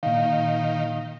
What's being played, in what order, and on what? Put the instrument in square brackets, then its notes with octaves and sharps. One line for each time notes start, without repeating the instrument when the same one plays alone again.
[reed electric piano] A#2 F5 [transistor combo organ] D#3